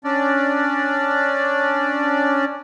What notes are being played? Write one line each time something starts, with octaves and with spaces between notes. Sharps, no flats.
C#4 D4 D5